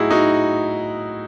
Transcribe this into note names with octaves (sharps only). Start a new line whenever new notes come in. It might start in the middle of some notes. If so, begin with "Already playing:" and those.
Already playing: A2 F#3 D#4 E4 F#4 G#4
D#4 F#4